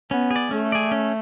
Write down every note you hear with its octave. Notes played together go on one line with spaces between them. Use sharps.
B3 C#4
G#4
D5
A3 C#4
G#4 D5
C#4